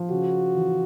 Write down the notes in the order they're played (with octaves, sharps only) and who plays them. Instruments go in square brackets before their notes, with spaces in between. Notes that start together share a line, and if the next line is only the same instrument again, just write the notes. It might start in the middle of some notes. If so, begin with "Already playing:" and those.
Already playing: [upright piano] F3
[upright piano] C#3 [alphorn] F#4
[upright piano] E3